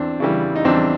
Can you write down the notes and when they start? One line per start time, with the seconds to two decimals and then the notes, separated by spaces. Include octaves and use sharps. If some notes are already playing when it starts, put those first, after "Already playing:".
Already playing: E2 C4 D4
0.20 C#3 E3 G3
0.56 D#4
0.65 E2 C4 D4